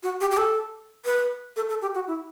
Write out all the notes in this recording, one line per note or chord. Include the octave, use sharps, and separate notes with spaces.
F#4
G4
G4
A4
B4
A4
A4
G4
F#4
E4